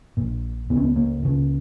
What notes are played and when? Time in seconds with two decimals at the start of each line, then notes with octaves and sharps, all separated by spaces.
0.17 A#1 A#2
0.70 C#2 C#3 B3
0.76 C#4
0.84 B3
0.96 A#3
1.22 C#2 C#3